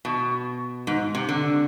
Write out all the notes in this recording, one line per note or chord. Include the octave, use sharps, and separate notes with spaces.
B2
G#2
C3
D3